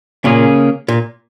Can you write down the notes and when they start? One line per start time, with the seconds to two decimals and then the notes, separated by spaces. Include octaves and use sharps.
0.24 A#2 C#3 A#3 C#4 G#4
0.88 A#2